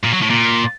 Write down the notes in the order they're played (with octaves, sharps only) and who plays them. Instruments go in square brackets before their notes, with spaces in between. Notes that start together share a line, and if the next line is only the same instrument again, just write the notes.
[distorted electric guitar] A#2
F#3
A2
A#2